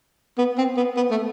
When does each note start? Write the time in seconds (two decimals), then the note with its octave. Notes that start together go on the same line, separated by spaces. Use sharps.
0.38 B3
0.58 C4
0.77 B3
0.97 B3
1.11 A3